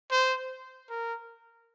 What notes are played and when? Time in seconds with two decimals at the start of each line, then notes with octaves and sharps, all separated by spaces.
0.11 C5
0.90 A#4